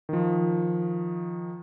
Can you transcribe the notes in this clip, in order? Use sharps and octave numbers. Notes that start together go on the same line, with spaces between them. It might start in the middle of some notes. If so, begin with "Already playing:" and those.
D#3 F3